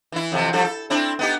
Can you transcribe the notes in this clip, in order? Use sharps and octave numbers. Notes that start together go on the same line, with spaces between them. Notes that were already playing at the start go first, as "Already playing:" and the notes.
E3 E4
F2 C3 E3
F3 G3 A4
A4
C4 D4 E4
B3 D#4 G4